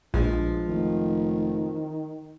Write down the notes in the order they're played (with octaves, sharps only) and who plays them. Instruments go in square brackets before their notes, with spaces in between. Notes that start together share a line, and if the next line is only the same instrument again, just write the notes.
[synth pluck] A#1 [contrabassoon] G2 [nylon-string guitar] F3 G#3
[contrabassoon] F1 [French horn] D#3